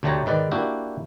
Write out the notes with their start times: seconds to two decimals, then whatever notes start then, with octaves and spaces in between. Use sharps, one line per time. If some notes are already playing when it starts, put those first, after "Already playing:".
0.03 D2 D3 A3 G4 C#5 A#5
0.26 G#2 D#3 B4 D5
0.51 A#3 D4 E4 F#4 G4